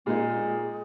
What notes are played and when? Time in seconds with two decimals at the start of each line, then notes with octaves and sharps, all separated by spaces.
0.06 A#2 G#3 A#3 D#4
0.38 G#4